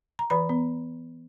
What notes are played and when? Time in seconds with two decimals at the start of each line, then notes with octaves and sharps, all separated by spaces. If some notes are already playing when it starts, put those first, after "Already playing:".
0.19 A#5
0.30 E3 B4 B5
0.49 B3